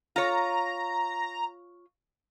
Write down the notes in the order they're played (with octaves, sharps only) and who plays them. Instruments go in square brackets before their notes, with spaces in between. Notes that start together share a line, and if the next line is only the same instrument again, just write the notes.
[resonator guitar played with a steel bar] F4 C#5 [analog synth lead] A#5